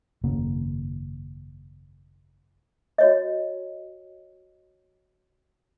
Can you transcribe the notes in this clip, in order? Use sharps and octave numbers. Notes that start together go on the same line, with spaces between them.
G#1 F#2 C#3 A#3
F#4 C#5 D#5